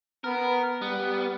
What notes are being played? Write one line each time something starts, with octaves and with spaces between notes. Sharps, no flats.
B3 A#4
G3 B3